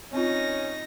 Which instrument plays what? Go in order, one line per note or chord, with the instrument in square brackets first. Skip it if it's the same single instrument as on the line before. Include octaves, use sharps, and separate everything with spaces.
[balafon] C4 F4 [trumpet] C#4 [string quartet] D#4 A#6